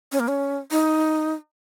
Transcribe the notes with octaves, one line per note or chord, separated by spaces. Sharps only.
C#4
A#3
C#4
D#4